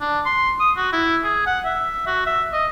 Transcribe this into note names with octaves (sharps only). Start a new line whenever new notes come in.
D4
C6
D#6
F#4
E4
G#4
F#5
E5
F#4
E5
D#5